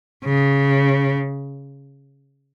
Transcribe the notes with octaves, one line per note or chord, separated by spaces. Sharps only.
C#3